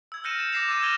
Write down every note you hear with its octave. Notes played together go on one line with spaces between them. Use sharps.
E6 G#6
F6 G6 A#6 C#7 D#7 E7
A6 E7
D6 G6 A#6 C7 E7 F7
D6 E6 A6 D#7 E7
F6 G#6 A#6 D#7 F7 G7